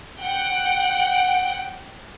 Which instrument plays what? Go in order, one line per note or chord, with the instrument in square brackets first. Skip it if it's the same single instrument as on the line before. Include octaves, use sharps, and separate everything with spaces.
[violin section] F#5 G5